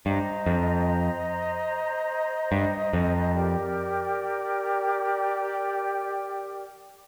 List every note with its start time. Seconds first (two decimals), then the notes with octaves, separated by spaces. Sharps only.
0.06 G2 C5 D#5 A#5
0.46 F2
2.52 G2
2.93 F2
3.34 G4 A#4 D5 G5